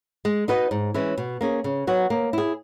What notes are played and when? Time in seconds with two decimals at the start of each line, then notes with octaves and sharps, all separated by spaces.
0.25 G#3
0.48 D#4 F#4 B4 D#5
0.71 G#2
0.94 E3 G#3 C#4 E4
1.18 B2
1.41 A#3 C#4 G#4
1.64 C#3
1.87 F#3 B3 F#4
2.10 A#3
2.33 E4 G#4